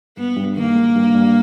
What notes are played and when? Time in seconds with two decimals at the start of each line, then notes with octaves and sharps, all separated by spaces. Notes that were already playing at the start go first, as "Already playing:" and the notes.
0.17 G2 B3
0.36 G2
0.56 D#3 A#3
0.75 G#3
0.96 G2
1.15 G2